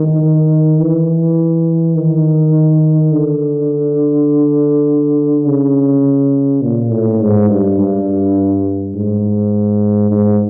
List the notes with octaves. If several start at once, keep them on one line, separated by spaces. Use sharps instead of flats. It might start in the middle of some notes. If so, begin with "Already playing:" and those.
Already playing: D#3
E3
D#3
D3
C#3
A#2
A2
G#2
G2
G2
G#2
G#2